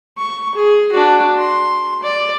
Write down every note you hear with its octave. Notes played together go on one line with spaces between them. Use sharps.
C#6
G#4
D4 F#4
C6
D5